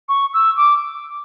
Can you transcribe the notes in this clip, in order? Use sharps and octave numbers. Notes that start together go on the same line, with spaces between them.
C#6
E6
D6